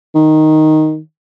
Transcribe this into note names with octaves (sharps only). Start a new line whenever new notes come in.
D#3